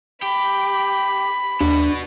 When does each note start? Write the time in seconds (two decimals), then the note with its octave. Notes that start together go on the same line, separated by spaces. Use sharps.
0.22 G4 B5
1.61 D#2 B3 D4 F#4